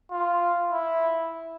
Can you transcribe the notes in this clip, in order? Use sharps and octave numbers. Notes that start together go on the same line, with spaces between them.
F4
E4